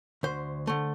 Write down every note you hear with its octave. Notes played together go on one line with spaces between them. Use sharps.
D2 C5
D3 A3